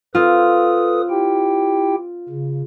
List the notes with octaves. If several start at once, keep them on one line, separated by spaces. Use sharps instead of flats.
C4 F4 A4 B4 D#6
E4 G4 G5
C#3